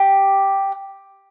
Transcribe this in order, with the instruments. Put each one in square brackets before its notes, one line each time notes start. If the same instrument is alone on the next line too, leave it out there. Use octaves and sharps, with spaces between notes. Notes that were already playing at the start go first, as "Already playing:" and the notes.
Already playing: [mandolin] G4